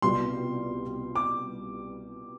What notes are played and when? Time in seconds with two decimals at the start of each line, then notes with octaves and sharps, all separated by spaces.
0.02 C2 B2 G3 B3 F4 C6
1.16 D6